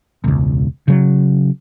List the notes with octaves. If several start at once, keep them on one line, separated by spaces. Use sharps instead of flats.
E1 C#2
C#3 F#3